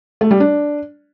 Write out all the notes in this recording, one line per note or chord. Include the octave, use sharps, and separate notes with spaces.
A3
G3
D4